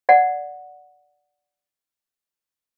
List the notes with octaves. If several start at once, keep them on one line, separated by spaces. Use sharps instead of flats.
D5 F#5